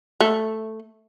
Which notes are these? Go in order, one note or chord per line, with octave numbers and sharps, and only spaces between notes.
A3